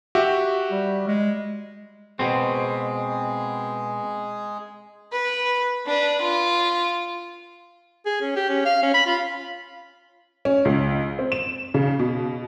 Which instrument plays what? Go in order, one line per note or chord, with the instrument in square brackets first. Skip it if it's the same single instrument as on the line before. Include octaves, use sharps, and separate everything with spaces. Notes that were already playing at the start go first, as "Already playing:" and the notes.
[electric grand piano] F#4 G4 E5
[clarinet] G3
G#3
[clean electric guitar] B2 C4 [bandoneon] G#3 G#4
[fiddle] B4
D4 B4
F4
[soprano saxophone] G#4
C#4
G4
C#4
F5
C#4
B5
F4
[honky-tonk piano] C#4
C#2
C4
E7
C#3
B2